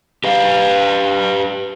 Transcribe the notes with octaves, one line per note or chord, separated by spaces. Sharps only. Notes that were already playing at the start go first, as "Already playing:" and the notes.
G4 B4 F5